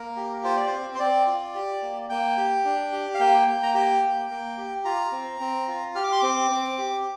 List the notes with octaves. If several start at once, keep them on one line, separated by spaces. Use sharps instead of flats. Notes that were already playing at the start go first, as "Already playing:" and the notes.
Already playing: A#3 A#4
G4
F4 C5
D5
C5
C4
C5
C4 D5
F4
G4
A#3
A#3 G5
G4
D4
G4
F5
A#3 G5
A#3
A#5
G4 G5
A#3
A#3
G4
F4 A#5
C4
C4
F4
G4 F6
D6
C6
C4 D6
C4
G4